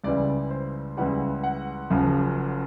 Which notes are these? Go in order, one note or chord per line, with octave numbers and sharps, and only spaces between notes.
C#2 C#3 E3 G3 D5
C5
C#2 C#3 E3 G3 F#5
F#5
F#1 F#2 C#3 F3